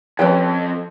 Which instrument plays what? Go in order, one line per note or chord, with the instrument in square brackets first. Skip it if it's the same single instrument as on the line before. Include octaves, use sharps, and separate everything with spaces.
[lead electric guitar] F2 [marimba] F3 [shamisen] C#4 B4 G5